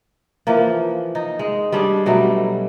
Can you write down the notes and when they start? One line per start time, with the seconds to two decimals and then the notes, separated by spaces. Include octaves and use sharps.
0.47 E3 F3 A#3
1.15 D#4
1.39 G#3
1.72 G3 C#4 D4 G#4
2.06 B2 F#3 G3 A3